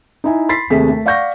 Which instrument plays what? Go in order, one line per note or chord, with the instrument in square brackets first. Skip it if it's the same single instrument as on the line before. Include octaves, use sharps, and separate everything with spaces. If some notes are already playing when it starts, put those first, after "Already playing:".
[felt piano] D#4 E4 G#5
B5 C6 A6 B6 C7
D#2 C3 A3 G#4 B6
A3
D5 F5 F#5 C#6 G6 A#6